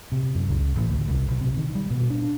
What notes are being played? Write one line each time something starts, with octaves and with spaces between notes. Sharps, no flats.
C3
F#2
C#2
A1
D2
C2
B1
C3
D#3
G3
B2
D4